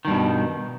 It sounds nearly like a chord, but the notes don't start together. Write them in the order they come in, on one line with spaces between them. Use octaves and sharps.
D#3 G2 B2